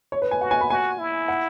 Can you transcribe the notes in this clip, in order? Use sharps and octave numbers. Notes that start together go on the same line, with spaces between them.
C#5
B4
G#5
F#4 F#5
G#5
B5
F#4 G#5
E4
F#5